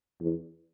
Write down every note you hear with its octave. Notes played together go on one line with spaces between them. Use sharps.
E2